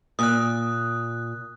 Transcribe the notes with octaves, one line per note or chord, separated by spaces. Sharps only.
A#2 D#6 F#6